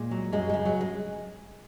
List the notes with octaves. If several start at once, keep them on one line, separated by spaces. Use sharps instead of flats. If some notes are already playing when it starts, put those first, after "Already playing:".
Already playing: A#2 G#3
F#3
F#2 G#3
C#3 G#3
F#3
G#3